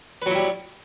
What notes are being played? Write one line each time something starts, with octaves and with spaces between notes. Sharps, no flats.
F#3 G3 E4 B4